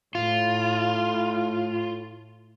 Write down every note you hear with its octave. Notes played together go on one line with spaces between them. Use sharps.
A2 F4